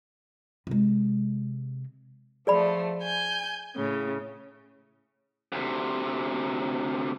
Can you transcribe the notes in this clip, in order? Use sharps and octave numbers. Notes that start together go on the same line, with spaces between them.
C3 G#3
F3 A3 G#4 D5 B5
G#5 G6
A2 C#3
D2 C3